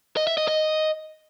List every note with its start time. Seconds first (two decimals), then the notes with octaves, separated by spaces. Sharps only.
0.17 D#5
0.27 E5
0.38 D#5
0.48 D#5